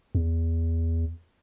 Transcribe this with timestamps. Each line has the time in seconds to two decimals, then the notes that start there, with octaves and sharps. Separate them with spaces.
0.15 E2